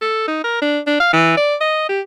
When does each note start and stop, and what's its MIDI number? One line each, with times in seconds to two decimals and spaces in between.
0.01 0.27 69
0.28 0.41 63
0.44 0.57 70
0.62 0.79 62
0.87 0.99 62
1.00 1.11 77
1.13 1.36 52
1.37 1.55 74
1.61 1.88 75
1.89 2.01 67